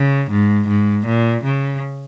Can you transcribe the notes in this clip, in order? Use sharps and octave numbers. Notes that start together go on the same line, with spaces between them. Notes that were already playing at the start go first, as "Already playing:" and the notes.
Already playing: C#3
G#2
G#2
A#2
C#3